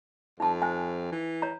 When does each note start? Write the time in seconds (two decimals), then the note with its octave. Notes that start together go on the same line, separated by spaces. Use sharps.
0.40 F2 D#4 A5
0.62 C5 G5 G#5
1.12 E3
1.42 C#5 A#5